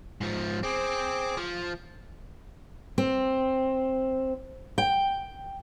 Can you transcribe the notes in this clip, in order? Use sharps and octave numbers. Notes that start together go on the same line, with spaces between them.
G#2 F3
C4 G#4 D6
F3
C4
G5